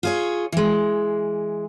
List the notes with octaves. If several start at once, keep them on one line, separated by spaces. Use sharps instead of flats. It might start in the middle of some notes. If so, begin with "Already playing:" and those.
F4 G#4 C#5
E3 G#3